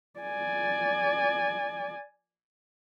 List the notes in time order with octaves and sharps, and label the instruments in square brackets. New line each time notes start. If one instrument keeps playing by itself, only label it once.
[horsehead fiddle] D5 G#5